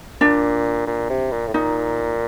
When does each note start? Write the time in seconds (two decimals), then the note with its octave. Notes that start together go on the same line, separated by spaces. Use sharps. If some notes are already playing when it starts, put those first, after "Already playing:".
0.21 A#2 D4
0.87 A#2
1.10 C3
1.32 A#2
1.47 A2
1.54 A#2 D#4